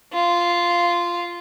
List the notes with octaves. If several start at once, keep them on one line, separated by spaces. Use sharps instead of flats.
F4